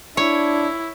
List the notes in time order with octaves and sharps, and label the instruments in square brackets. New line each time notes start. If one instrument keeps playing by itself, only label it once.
[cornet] D4 [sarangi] E4 [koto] C#5